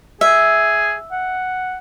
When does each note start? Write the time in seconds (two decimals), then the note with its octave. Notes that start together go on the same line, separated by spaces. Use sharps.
0.21 G#4 E5
1.12 F#5